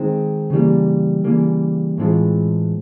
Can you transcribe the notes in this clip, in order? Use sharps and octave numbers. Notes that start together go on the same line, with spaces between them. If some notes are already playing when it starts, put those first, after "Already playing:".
Already playing: D#3 G#3 C4
C#3 E3 G3 A#3
C#3 E3 G3 A#3
A2 E3 G#3 C4 F4